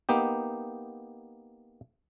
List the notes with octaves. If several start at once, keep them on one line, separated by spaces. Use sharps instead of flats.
A#3 B3 D#4 G4